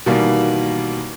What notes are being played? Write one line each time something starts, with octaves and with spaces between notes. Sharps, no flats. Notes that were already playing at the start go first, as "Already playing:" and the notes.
B2 D#3 E3 G3 A#3